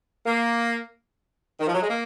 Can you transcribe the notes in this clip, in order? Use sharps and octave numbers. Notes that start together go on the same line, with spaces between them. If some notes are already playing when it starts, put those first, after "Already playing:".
A#3
D#3
F3
F#3
G#3
A#3